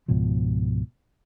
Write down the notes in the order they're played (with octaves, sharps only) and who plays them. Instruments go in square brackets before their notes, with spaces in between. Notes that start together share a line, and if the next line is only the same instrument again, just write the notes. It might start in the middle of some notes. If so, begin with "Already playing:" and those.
[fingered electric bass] C#2 G#2 B2 F3